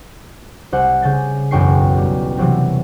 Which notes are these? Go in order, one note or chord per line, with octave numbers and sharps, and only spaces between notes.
C2 C5 F#5
C#3 G6 A6
E1 B1 F#2 G5 C#6 C7
G3
C3 E3 F#3 C4